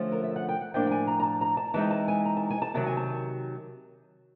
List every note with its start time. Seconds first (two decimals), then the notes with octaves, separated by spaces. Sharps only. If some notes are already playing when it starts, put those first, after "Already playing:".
Already playing: D3 F3 A3 C#4
0.12 A#4
0.24 E5
0.36 F#5
0.49 G5
0.61 F#5
0.74 A2 F3 A#3 D4 G5
0.87 G5
0.91 G#5
1.07 A#5
1.20 A#5
1.24 A5
1.41 A#5
1.57 A5
1.74 E3 G#3 C4 D#4 A5
1.91 A5
2.08 G#5
2.25 A#5
2.37 A5
2.50 G#5
2.62 A5
2.74 C3 D#3 F#3 A5
2.87 G#5
2.97 A5